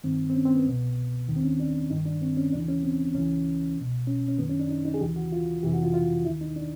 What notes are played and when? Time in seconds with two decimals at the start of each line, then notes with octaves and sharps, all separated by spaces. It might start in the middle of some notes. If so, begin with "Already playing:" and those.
0.04 G2 D#3 C4
0.29 C4
0.34 C#4
0.45 C4
0.55 B3
0.66 C2 B2
1.28 D#2 D#3
1.36 C4
1.43 C#4
1.60 D4
1.90 G2 D#3 D#4
2.06 D4
2.22 C4
2.37 C#4
2.52 D#2 C#3 E3 D4
2.68 C#4
2.83 C4
3.14 C#2 C#3 E3 C#4
3.77 C2 B2
4.07 C#4
4.28 C#4
4.38 F#2 D#3 B3
4.49 C#4
4.59 D4
4.69 D#4
4.85 D#4
4.94 G#4
5.01 D#2 C#3 E3 G4
5.16 F#4
5.32 F4
5.63 F2 C3 E3 G4
5.73 F#4
5.83 F4
5.94 F4
6.25 D#2 D#3 E4
6.41 D#4
6.56 D4